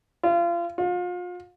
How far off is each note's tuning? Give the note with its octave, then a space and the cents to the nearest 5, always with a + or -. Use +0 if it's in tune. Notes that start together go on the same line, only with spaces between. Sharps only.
F4 -30
F4 +35